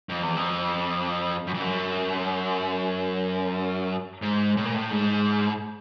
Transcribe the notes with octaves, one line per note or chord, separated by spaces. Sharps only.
F2
E2
F2
F#2
F2
F#2
G#2
A2
A#2
A2
G#2